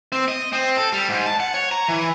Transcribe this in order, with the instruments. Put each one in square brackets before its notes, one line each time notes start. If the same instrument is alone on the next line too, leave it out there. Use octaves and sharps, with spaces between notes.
[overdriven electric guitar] C4
D#5
C4
A4
G3
G#2
A5
F#5
C#5
A#5
E3